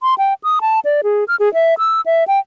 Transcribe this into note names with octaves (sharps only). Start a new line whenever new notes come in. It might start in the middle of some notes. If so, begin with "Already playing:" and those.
C6
G5
D#6
A5
D5
G#4
F6
G#4
E5
E6
E5
G5